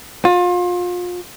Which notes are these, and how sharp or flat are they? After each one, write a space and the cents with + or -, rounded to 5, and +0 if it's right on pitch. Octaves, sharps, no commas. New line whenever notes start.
F4 +30